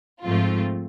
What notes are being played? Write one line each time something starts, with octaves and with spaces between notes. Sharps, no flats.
G#2 F3 A3 C4 F4